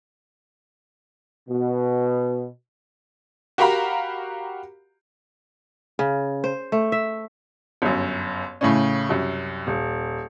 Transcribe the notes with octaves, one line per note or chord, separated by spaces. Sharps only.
B2
F#4 G4 A#4 F5 A#5 B5
C#3
C5
A3
E5
G1 F#2
A2 C#3 C#4
C2 F#2
D#1